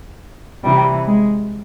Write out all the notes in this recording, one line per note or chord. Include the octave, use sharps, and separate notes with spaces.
C3 E3 G3
G#3